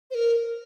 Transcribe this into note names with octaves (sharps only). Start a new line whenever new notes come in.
C5
A#4